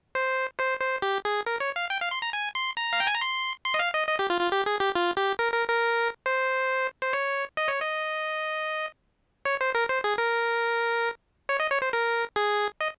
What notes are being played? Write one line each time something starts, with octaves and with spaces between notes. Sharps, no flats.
C5
C5
C5
G4
G#4
A#4
C#5
F5
G5
F5
C6
A#5
G#5
C6
A#5
F5
G5
G#5
A#5
C6
C6
D#5
F5
D#5
D#5
G4
F4
F4
G4
G#4
G4
F4
G4
A#4
A#4
A#4
C5
C5
C#5
D#5
C#5
D#5
C#5
C5
A#4
C5
G#4
A#4
C#5
D#5
C#5
C5
A#4
G#4
D#5